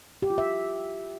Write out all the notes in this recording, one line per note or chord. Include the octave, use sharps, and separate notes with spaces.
G4
F4
E5